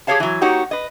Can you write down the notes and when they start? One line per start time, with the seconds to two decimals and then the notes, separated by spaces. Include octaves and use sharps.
0.07 G4 G#4 A#4 C#5 F5 A5
0.20 E3 F#3
0.41 A#3 D#4 F#4 G4 C#5
0.71 B4 D#5